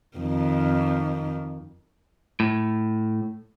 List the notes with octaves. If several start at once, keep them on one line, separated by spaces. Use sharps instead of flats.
F2 D#3
A2